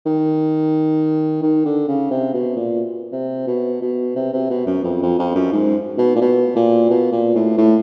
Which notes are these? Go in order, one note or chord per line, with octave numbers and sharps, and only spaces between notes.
D#3
D#3
D3
C#3
C3
B2
A#2
C3
B2
B2
C3
C3
B2
F#2
F2
F2
F2
F#2
G#2
B2
A#2
B2
A#2
B2
A#2
A2
A2